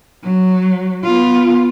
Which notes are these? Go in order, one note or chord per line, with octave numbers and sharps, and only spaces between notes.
F#3
B3 F4